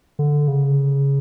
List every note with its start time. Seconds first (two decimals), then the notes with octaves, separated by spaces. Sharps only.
0.19 D3
0.48 C#3